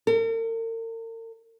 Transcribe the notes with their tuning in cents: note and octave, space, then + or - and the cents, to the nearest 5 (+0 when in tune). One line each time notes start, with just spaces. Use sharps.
A#4 -45